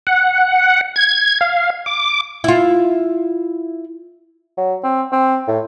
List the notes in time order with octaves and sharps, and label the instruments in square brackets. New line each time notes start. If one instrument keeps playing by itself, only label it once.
[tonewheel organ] F#5
G#6
F5
D6
[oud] E4 F4
[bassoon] F#3
C4
C4
A2